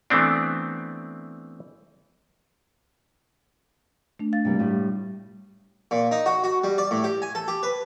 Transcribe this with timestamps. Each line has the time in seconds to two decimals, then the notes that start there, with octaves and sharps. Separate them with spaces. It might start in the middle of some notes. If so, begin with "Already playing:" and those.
0.10 E3 A3 B3 C4 D4
4.19 A3 D4
4.33 F5 A6
4.45 C3 G3 A#3
4.59 A2 G3 F4
5.91 A#2
6.11 D#4
6.26 F#4
6.44 F#4
6.64 G3
6.78 D5
6.91 A2
7.04 G4
7.22 G#5
7.35 A4
7.48 G4
7.63 B4